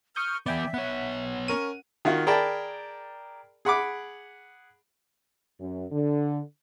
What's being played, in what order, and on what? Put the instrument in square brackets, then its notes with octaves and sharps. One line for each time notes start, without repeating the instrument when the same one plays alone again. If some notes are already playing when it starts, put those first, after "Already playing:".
[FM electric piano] C#6 D#6 G6 [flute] F6
[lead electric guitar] E3 B3 [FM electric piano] D5 G5 G#5 [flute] E5
[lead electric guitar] B3 C#5 [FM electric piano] F#5
[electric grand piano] C#4 A#4 D#7 [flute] C#6
[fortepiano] D#3 F4 F#4
G#4 A#4 D5 G5 A5 B5
G#4 F#5 B5 D6
[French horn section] F#2
D3